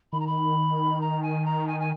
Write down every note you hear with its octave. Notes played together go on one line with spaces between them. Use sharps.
D#3 B5
A#5
B5
A#5
G#5
A#5
G#5
G#5